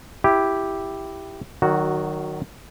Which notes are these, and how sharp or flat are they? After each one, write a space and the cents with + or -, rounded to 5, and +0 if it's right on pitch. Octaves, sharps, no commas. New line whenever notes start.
E4 +0 G4 +0
D#3 -20 F#3 +15 F#4 +0